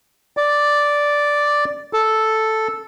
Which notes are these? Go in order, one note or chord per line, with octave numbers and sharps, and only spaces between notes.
D5
A4